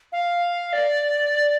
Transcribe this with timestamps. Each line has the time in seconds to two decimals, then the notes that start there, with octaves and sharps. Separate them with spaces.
0.12 F5
0.73 D5